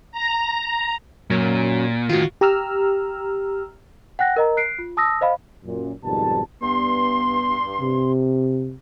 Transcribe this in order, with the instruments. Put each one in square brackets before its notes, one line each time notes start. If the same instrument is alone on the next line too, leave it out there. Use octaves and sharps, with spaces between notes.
[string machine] A#5
[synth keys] F#2 F#3 C#4 [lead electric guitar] A#2
[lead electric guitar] A2 D#3 [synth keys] F4 F#4
[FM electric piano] G4 A#5 E6 F6
[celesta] F#5 G5 F#6 A#6
A#4 D#5 A#5
F#6 C7 D7
F4
A5 D#6 E6 A#6
C5 D#5 F5 B5
[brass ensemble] F#2 A#2
F2 G#2 B2 D#3 G3 A5
[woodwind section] G2 C6 [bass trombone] B3
[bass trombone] C3